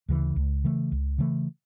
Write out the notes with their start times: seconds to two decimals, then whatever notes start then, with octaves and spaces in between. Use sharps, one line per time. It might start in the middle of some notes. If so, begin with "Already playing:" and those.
0.09 D2 C#3 E3
0.36 C#2
0.64 C#3 E3 A3
0.92 C#2
1.18 C#3 E3 A3